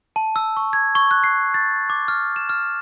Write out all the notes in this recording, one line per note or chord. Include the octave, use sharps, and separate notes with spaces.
A5
E6
C#6
G#6
C#6
F#6
C7
A6
D6
F6
E7
F6